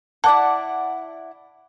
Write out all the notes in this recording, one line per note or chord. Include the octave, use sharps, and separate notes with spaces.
E4 D5 F#5 A5